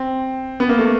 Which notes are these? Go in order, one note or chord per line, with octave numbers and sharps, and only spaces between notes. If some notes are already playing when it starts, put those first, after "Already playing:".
Already playing: C4
B3
A#3
A3